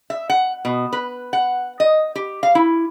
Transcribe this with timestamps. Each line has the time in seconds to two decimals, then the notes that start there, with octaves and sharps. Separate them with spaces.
0.10 E5
0.30 F#5
0.65 B2
0.93 B4
1.33 F#5
1.80 D#5
2.16 G4
2.43 F5
2.55 E4